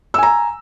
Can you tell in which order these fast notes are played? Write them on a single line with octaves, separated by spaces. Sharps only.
E6 G#5 A#5